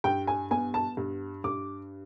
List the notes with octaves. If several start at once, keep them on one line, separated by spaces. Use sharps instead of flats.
G2 G5
G#5
B3 G#5
A5
G2
G2 D6